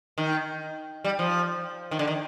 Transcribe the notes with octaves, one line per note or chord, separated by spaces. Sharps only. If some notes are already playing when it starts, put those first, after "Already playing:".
D#3
G3
F3
D#3
D3
D#3